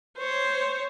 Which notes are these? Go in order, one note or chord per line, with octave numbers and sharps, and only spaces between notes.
C5 C#5